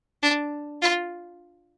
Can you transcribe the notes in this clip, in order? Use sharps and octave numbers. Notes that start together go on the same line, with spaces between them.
D4
F4